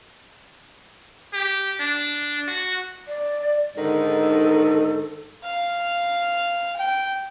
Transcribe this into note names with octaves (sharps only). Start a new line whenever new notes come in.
G4
D4
F#4
D5
G#2 D3 D#3 A4
F5
G5